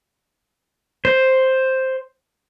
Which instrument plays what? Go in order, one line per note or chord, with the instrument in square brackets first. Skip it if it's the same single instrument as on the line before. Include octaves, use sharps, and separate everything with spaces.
[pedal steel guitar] C5